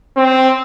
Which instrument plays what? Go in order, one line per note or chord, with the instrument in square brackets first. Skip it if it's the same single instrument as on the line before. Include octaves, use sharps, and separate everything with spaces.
[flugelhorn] C4